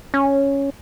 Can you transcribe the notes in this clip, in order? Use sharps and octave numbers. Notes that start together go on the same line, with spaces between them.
C#4